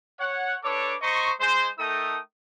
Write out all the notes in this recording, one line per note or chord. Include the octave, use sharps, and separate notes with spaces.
C#5 F#5
D4 A4 B4 C#5 D6
C5 D#5 A#5 C#6
G#3 C5
A3 D#4 A4 A#4 G5 D#6